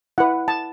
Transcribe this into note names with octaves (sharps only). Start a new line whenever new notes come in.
E4 B4 F#5
A5